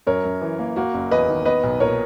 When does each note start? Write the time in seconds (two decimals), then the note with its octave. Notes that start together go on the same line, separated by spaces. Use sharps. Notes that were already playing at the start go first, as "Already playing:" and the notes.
0.07 F#2 A#4 C#5
0.25 F#2
0.42 E3
0.59 A#3
0.76 A#3 F#4
0.94 F#1
1.11 E2 B4 D#5
1.29 D#3
1.45 B3 B4 D#5
1.63 B1
1.80 A#2 A#4 C#5